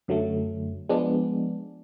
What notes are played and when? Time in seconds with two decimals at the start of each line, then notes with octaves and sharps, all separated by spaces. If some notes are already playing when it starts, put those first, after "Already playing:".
0.08 F#2 D3 F#3 A3
0.89 F3 G#3 B3 D4